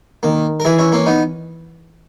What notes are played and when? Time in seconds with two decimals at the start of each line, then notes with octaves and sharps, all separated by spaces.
0.23 D#3 A#3
0.60 A#4
0.65 E3 E4 G#4
0.78 C#4 E4
0.92 A#3 C#4
1.06 B3 D#4